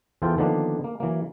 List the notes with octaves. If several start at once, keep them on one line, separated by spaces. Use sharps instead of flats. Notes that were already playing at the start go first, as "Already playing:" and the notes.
E2 E3 F4 A4 C5 G5
D3 D#3 F3 A#3 B3 D4
A#3
E3 F#3 A#3